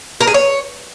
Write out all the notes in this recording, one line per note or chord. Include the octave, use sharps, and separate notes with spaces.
A#4
G#4
C#5